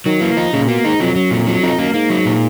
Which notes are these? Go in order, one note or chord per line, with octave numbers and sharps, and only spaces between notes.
D#3 F#3
E3 A#3
F3 D#4
A#2 C#3
B2 A#3
G#2 D#4
F2 F#3
F#2 F#3
F2 A#2
F2 F#3
F2 D#4
F#2 A#3
G#2 A#3
F#3
A#2